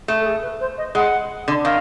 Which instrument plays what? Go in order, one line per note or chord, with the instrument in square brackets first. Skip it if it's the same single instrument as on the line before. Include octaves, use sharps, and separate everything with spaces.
[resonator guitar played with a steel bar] A3
[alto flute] A4
G#4
B4
C5
D#5
[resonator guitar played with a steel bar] G#3 [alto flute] F#5
[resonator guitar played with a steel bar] D3
[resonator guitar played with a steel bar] D#3 [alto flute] F5